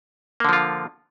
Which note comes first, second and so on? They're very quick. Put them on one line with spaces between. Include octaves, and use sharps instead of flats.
A#3 D3 F3 F4